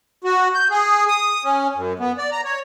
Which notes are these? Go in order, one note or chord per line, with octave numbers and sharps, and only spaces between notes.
F#4
G6
G#4
D#6
C#4
F#2
B3
D5
A#5
C#5